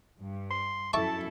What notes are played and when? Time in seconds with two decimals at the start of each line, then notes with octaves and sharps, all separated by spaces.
0.19 G2
0.50 C6
0.93 F#2 E4 A4 E5 A5 C#6 D6